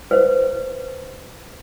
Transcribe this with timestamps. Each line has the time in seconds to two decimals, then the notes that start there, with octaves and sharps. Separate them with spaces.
0.11 B4 C5